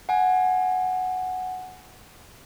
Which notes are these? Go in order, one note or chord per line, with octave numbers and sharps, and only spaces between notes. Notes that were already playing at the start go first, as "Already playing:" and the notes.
F#5 G#5